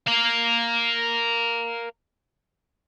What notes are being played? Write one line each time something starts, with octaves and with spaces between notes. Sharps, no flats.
A#4 F5